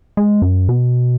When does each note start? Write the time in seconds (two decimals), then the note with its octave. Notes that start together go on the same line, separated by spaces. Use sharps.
0.17 G#3
0.42 F#2
0.69 B2